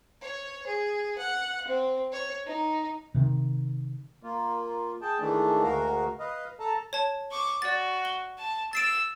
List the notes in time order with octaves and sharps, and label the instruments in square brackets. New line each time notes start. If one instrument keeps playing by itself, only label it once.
[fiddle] C#5
G#4
F#5
C4
C#5
D#4
[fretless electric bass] C3 D#3 C4
[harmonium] A#3 F4
G#4 G5 A5
D#3 E3 G#3 A3 D4
D2 G#3 F#4 A#4 F5
B4 D#5 F5
A4 A5 A#5
[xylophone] C#5 A5
[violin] C#6 D6
[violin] F#4 [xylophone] D5 A6
[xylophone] G7
[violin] A5
[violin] E6 [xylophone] A6 C7 D7